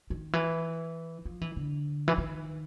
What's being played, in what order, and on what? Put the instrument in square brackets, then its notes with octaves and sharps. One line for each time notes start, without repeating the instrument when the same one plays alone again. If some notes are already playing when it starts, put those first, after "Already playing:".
[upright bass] D#3
E3
F3
E3
D3
E3
D#3